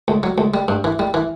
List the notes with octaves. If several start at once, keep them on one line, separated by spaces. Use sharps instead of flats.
C#2
F#3
C#2
G3
G2
E3
G3
E3